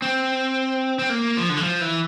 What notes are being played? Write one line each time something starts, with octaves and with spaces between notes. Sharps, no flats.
C4
C4
A#3
F3
D3
E3
F3
E3